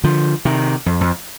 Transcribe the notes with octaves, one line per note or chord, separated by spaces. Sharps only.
D3 F3
C3 D#3
F2
F2